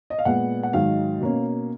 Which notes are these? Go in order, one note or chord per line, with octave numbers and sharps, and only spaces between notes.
D#5
F5
A#2 G#3 B3 F#5
F#5
G#2 D#3 F#3 F5
B2 A#3 C#4